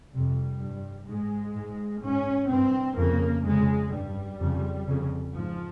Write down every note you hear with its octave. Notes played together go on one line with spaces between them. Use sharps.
F2 C3 G3
G2
G#2 G#3
G#2
G#2 C#4
G2 C4
F2 C#3 A#3
F2 C#3 G#3
G2 G3
F2 C#3
F2 C#3
G#2 F3